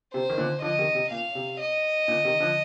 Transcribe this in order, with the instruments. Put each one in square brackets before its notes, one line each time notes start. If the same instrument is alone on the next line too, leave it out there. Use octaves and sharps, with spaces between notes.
[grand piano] C3 [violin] C5
[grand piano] D#3
A#2 D3
[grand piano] D3 F3 [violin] D#5
[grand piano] C3 D#3
C3
[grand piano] A#2 [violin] F5
[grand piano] C3
[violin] D#5
[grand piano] A#2 D3
C3 D#3
D3 F3